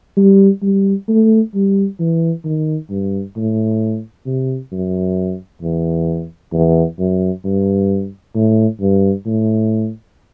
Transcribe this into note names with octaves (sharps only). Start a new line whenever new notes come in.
G3
G3
A3
G3
E3
D#3
G2
A2
C3
F#2
E2
E2
F#2
G2
A2
G2
A2